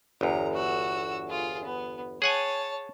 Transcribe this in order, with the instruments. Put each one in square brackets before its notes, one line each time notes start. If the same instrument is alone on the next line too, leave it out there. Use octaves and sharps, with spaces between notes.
[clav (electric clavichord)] G1 E2 [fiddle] A#5
[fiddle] F#4 E6
F4 G#4
B3
[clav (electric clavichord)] G#4 F#5 G#5 [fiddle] C#5 A5